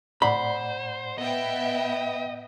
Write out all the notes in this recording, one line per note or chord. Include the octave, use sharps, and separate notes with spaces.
A2 C5 D5 F#5 B5
B3 D#5 E5 G5